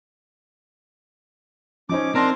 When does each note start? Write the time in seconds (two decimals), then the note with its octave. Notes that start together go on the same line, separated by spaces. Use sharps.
1.89 F3 C#4 D#4 C5 D6
2.15 C4 D4 A#4 A#5 C6